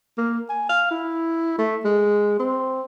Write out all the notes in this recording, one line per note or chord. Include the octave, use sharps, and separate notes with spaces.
A#3
G#5
F5
E4
A3
G#3
C4